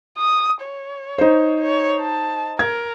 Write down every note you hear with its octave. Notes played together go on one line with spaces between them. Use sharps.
D#6
C#5
D#4 C5
C#5
A5
A#4 G#6